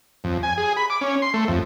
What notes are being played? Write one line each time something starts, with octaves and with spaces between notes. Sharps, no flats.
F2
G#5
G#4
B5
D6
C#4
C6
A3
F2